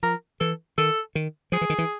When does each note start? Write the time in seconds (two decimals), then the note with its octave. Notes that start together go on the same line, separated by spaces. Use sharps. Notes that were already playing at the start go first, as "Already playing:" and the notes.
0.03 F3 A#4
0.40 E3 A4
0.78 D#3 A4
1.15 D#3
1.52 F3 G#4
1.61 E3
1.70 D#3
1.78 E3